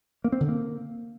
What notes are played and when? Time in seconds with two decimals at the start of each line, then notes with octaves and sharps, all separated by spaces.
0.24 A#3
0.32 C4
0.40 D3
0.49 A#3